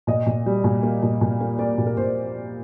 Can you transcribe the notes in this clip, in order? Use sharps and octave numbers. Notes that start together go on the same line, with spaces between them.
A#2 D#5
A#2
G3
A#2
A#3
A#2
A#2
A#3
A#3 D5
A#2
A#4
A#2 C5